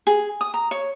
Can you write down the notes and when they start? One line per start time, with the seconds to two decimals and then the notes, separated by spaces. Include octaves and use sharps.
0.07 G#4
0.41 D#6
0.54 A#5
0.71 C#5